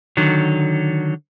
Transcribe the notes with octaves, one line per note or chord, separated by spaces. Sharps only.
D3 D#3 F#3